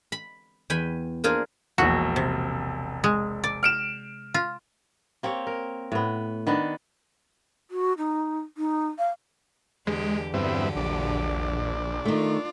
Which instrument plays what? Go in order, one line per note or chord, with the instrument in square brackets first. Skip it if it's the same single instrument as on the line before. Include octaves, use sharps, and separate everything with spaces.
[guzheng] B5
E2 G5 G#5 B5
A#3 D4 F4 G#4 A#4 C5
[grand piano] E1 A#1 [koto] F#4
[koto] C3
G#3
D5
[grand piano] F6 D7 E7
[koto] F4
[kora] A#3 C4 G4 C#5
A#4
A2 B3
D#3 B3 D4
[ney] F#4
D#4
D#4
F5
[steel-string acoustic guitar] E2 [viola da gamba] D3 G4 [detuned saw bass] G#3
[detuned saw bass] G2 [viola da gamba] D3 F#3 G4 [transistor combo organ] B3 C4 E4
[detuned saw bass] A#1 [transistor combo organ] D4
[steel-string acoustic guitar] D#3 A3 [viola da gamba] F4